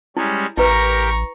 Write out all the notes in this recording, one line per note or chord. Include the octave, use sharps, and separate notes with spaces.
G3 G#3 C#4 E4
A1 E4 G4 A#4 B4 A#5 C#6